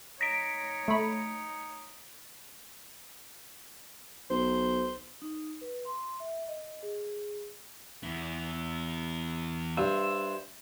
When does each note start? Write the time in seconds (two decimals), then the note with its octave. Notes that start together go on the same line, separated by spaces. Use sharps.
0.21 D#4 C#5 A#6 B6 D7
0.88 A3 B5
4.30 B1 C5
5.22 D#4
5.61 B4
5.85 C6
6.20 E5
6.48 D#5
6.83 G#4
8.03 E2 E4
9.77 G2 C5 E5